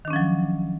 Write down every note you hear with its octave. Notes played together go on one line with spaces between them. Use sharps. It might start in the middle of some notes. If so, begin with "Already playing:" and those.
D#3 F3 F#3 C#4 D4